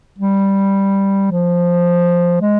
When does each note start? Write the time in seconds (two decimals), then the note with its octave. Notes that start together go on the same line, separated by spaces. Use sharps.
0.19 G3
1.31 F3
2.41 G#3